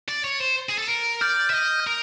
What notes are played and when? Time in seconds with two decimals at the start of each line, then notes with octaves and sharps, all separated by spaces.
0.09 D5
0.24 C#5
0.41 C5
0.69 G#4
0.79 A4
0.89 A#4
1.21 D5 F6 G6
1.50 E5
1.54 D#5
1.87 A#4